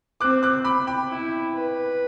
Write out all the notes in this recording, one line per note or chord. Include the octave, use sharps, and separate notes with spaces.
C4 D6 F#6
D6 F#6
B5 D6
G5 B5
E4
B4